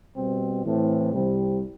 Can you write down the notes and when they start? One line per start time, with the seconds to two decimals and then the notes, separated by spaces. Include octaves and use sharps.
0.16 B2 G3 C4
0.64 A2 E3 A3 C4
1.13 C2 C3 G3 C4